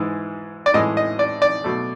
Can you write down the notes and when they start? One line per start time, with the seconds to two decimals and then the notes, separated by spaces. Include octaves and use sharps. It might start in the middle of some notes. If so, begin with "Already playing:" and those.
Already playing: G#2 E3 G#3
0.66 D5
0.74 A2 E3 G#3 D#5
0.97 D#5
1.19 D5
1.42 D5
1.64 B2 F#3 A3